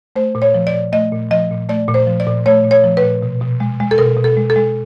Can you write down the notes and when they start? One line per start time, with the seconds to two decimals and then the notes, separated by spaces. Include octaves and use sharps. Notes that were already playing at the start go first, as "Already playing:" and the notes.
0.16 A3 C5
0.35 A#2
0.42 C#5
0.54 F3
0.67 D5
0.73 A#2
0.93 A3 D#5
1.12 A#2
1.31 F3 D#5
1.51 A#2
1.69 A3 D5
1.88 A#2
1.94 C5
2.07 F3
2.20 D5
2.27 A#2
2.46 A3 C#5
2.64 A#2
2.71 C#5
2.84 F3
2.97 B4
3.03 A#2
3.22 B2
3.41 B2
3.60 G#3
3.80 G#3
3.91 A4
3.98 B2 A#4
4.17 B2
4.24 A4
4.37 G#3
4.50 A4
4.56 G#3